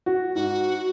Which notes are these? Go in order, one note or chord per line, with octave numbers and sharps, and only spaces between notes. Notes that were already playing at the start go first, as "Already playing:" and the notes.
F#4
G#2 F#4